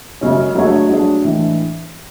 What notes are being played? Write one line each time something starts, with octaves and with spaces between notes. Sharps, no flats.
F#2 C#3 G#3 C#4
F#3 A3 D4 G#4 C#5
F#3 A3 D4 G#4 C#5
A2 E3 G#3 D4